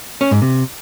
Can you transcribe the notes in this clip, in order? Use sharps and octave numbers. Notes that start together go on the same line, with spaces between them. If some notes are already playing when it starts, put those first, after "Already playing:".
C#4
G#2
C3